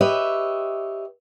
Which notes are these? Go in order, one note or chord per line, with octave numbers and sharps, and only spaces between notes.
G4 B4 C#5 D#5 E5